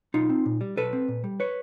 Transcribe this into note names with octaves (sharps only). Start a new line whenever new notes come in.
B1 D#4 F4
C4
A#2
G3
B1 A4 B4
C4
A#2
G3
B4 C#5